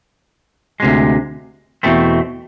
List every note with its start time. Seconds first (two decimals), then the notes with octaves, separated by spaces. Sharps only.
0.80 D2 C3 G#3
1.83 E2 B2 A3 C4